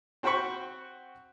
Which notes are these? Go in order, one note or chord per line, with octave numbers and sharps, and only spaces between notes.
C4 F#4 C5 G5 B5 C#6